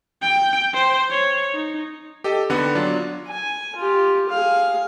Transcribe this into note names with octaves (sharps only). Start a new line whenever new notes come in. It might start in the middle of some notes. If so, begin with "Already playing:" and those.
G5
C5
C#5
D#4
G4 A4 D#5
D#2 D3 B3 F#5
F#3 D4 F4
G#5
F4 G4
G#4 F5